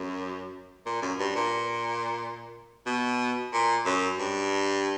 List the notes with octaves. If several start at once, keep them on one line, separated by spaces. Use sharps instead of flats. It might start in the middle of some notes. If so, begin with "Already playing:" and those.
Already playing: F#2
A#2
F#2
G2
A#2
B2
A#2
F#2
G2